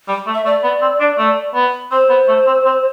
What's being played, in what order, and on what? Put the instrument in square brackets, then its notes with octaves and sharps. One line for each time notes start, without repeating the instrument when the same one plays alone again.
[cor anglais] G3
A3
[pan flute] E5
[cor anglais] A3 [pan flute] D5
[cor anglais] B3
C4
D4
A3
B3
[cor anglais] C4 [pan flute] C5
[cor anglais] B3
A3
C4
C4